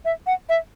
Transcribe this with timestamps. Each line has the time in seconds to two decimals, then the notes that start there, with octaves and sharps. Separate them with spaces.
0.05 E5
0.26 F#5
0.49 E5